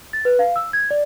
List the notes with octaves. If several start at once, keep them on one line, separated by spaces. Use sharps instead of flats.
A6
B4
F5
E6
G#6
D5